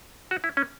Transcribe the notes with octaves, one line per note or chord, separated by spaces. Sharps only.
F#4
E4
C#4